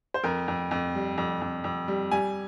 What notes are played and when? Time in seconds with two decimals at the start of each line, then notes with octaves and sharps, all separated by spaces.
0.14 C5
0.24 F2 A#4
0.48 F2
0.71 F2
0.95 G3
1.18 F2
1.41 F2
1.64 F2
1.88 G3
2.11 G3 G#5